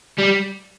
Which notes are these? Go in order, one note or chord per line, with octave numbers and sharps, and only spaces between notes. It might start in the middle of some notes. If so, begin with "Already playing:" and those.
G3